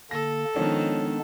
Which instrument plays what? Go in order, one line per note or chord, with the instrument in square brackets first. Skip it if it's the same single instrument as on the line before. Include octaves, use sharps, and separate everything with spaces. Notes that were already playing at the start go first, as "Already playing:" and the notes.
[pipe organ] D3 A#3 [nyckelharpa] A4 [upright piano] A#6
[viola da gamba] D#3 [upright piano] F3 C#4 [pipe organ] G#3 B3 D4